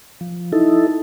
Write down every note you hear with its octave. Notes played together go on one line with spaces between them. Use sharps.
F3
D#4 E4 A4